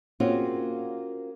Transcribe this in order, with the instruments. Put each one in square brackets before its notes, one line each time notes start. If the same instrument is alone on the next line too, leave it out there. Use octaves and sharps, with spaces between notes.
[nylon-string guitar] A#3 C4 C#4 F4 F#4 G#4